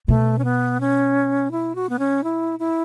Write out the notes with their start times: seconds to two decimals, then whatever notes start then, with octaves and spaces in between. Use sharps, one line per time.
0.08 B2 A3
0.38 C#4
0.44 B3
0.80 C#4
1.51 E4
1.75 F#4
1.89 B3
1.99 C#4
2.24 E4
2.59 E4